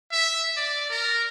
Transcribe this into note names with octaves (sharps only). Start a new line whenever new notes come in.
E5
D5
A#4